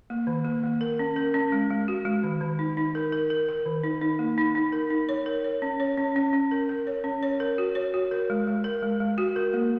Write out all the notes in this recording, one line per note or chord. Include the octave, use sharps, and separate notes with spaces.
A#3
D#3
A#3
A#3
A#4
C#4
A#4
C#4
G#3
G#3
F#4
G#3
D#3
D#3
D#4
D#4
A#4
A#4
A#4
A#4
D#3
D#4
D#4
A#3
D#4
D#4
A#4
D#4
C#5
A#4
C#5
C#4
C#5
C#4
C#4
C#4
A#4
A#4
C#5
C#4
C#5
A#4
F#4
C#5
F#4
A#4
G#3
G#3
A#4
G#3
G#3
F#4
A#4
A#3